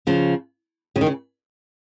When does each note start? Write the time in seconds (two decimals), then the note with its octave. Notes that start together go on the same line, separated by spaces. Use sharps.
0.07 C#3 F3
0.96 C#3 F3
1.01 D#3
1.06 C#3